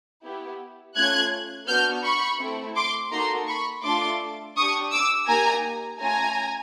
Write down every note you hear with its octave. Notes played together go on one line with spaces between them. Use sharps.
B3 E4 G4
A3 C#4 F4 F#6 G#6
B3 D4 F#4 F6 G6
B5 C#6
A3 C4 E4
C6 D6
A#3 D#4 F#4 A4 A#5 C6
B5 C#6
A3 D4 F4 A4 C6 D6
D4 G4 C#6 D#6
D6 E6
A#3 D#4 G4 G#5 A#5
A3 C#4 F4 G#5 A#5